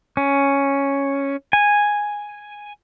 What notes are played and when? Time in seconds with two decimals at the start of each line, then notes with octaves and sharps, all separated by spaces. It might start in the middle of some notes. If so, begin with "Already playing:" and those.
0.17 C#4
1.53 G#5